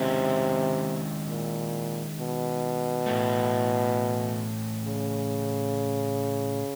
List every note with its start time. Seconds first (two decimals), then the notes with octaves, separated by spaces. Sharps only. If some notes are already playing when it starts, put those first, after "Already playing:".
Already playing: C3 D#3 G#3 C#4 E4
1.29 A#2
2.18 B2
3.06 A2 E3 A3
4.84 C#3